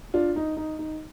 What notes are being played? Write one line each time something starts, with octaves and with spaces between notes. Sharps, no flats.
D4 F4
D#4
D#4
D#4